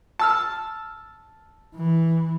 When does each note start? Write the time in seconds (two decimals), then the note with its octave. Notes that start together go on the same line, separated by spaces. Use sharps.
0.19 A5 E6 F6
1.76 E3